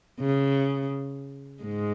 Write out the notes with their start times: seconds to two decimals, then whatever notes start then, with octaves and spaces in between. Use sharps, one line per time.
0.20 C#3
1.63 G#2 G#3